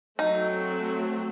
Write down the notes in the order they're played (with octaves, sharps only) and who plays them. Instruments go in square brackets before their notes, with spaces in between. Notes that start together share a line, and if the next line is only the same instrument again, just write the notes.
[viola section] F#3 A3 C4 [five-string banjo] D#4